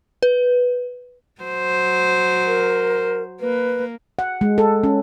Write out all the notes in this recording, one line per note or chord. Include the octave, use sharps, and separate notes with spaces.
B4
F#3 C5
A#4
A#3 B4
F#5
G#3
A4
C#4